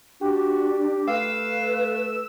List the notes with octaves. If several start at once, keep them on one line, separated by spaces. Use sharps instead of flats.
D4 F#4 G4
A3 B4 F5 E6